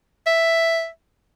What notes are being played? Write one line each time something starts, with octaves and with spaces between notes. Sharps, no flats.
E5